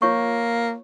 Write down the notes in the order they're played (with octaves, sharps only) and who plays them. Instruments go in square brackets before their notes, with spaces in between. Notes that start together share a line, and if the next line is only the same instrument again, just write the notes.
[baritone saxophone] A#3 [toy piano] F4 C#5 C#6